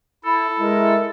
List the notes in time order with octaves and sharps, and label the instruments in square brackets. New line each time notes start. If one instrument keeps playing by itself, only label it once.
[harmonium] E4 [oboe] A4
[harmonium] G#3 [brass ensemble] E4 A#4